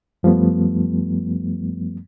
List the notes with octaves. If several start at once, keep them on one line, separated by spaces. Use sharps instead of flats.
F#2 F3 G3 A3 B3